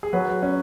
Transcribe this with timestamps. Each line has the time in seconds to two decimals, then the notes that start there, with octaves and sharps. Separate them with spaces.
0.03 G#4
0.13 F#3 B4
0.43 C#4